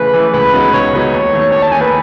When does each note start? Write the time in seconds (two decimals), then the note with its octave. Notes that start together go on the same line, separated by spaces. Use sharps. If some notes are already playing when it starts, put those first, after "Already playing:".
Already playing: C#3 E3 A3 B4
0.14 E3 A3
0.33 C#2 B4
0.53 C#3 F#3 B3 D#4
0.73 C#2 C#5
0.93 C#3 F#3 B3 D#4
1.12 D#2
1.33 D#3 A3
1.52 D#2 C#5
1.62 A5
1.72 D#3 A3 G#5
1.81 B4